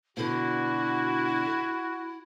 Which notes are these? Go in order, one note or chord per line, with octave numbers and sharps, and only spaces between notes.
B2 D3 E4 F#4